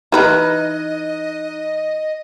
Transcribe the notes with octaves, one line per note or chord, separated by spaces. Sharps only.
E3 D#4 B4 D#5 A#5 F#6